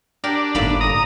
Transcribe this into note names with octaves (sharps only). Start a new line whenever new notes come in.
D4 G4 A#4
G1 A2 A#3 D#4 B5
A#5 D#6